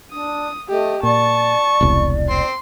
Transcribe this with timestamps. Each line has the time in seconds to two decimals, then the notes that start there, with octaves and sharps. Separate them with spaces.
0.12 D4 D#6
0.69 A3 G4 D#5
1.03 A#2 D5 A5 C#6
1.81 E1 C2
2.29 C4 C6